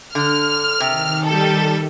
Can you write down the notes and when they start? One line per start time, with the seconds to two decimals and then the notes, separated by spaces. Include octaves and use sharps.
0.15 D3 F6
0.80 C3 D#3
1.26 G3 A4